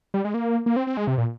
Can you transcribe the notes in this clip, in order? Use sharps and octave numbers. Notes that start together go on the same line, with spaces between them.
G3
G#3
A#3
A#3
C4
C4
G#3
C3
A#2